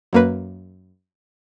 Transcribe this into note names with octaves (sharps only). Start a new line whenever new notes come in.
F#2 A#3 B4